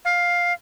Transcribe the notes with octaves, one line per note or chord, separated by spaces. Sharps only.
F5